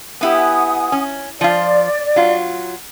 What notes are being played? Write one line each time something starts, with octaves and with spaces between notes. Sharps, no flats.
B3 E4 G4 F#5 G#5 D#6
C#4
F3 F4 D5
F#3 F4